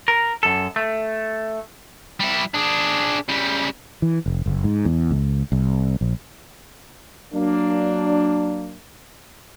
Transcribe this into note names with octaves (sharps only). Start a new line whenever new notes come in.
A#4
F#2 A4
A3
G3 E4
D4 G#4
C#3 G3
E3
F1
F#1
G#2
E2
C#2
C2
A#1
F#3 A#3 D4